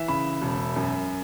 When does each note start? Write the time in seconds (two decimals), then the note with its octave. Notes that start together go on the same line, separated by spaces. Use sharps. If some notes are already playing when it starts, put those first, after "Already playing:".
Already playing: E3 E5
0.08 C#3 B5
0.42 E1
0.76 F#2